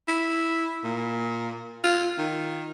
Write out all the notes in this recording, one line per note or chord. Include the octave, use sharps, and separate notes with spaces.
E4
A#2
F4
D#3